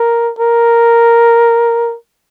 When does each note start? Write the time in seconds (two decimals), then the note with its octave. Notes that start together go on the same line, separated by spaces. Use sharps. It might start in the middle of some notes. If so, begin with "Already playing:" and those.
Already playing: A#4
0.39 A#4